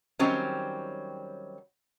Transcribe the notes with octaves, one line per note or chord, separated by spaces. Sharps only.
D#3 F#3 G3 C4 C#4